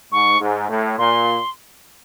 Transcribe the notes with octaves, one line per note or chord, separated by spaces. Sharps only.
G#2 C#6
G#2
A2
A#2 C6